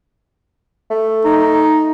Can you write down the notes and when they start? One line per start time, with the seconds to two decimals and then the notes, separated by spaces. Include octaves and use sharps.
0.90 A3
1.25 D#4